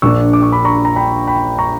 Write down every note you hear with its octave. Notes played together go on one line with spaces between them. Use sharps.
A#1 A#2 A#3 D4 C#6 E6
D6
C#6
B5 D6
A#5 C#6
A#5
G5 B5
G5 B5
A#5 C#6